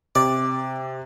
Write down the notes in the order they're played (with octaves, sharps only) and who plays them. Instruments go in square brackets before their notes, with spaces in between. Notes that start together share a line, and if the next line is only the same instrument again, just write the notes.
[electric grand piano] C3 [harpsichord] D5